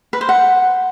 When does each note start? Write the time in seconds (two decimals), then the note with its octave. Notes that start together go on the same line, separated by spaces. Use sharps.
0.13 B4
0.21 C5
0.29 F#5